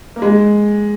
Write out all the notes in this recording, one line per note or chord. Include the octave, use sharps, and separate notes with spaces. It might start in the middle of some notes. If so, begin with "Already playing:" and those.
A#3
G#3